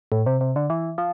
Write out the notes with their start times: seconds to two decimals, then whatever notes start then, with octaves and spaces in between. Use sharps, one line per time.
0.12 A2
0.26 C3
0.41 C3
0.56 D3
0.70 E3
0.98 F3